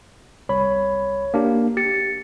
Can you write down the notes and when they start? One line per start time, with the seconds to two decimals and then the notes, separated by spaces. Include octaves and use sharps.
0.49 C2 C#5 B5
1.34 A#3 D4 G4
1.77 G4 A6 C#7